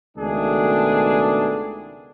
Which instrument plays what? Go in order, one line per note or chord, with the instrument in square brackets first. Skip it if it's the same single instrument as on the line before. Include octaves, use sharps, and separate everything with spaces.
[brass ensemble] C#2 B2 D#3 A3 D4 G#4